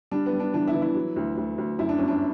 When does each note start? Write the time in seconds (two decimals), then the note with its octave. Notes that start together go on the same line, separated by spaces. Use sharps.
0.11 G3 D4
0.26 B3
0.33 G3
0.40 D4
0.54 E3 D4
0.68 E4
0.74 E3
0.82 E4
0.95 F#3
1.16 D2
1.37 D2
1.58 D2
1.79 F#2 E4
1.89 D4
1.98 G1 C#4
2.08 D4